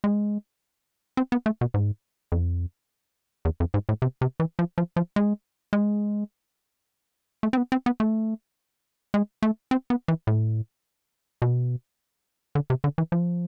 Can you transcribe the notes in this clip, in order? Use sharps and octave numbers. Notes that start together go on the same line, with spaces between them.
G#3
C4
B3
A3
B2
G#2
F2
E2
F2
G#2
A2
C3
C3
E3
F3
F3
F3
G#3
G#3
A3
C4
B3
C4
B3
A3
G#3
A3
C4
B3
E3
A2
B2
D3
C3
D3
E3
F3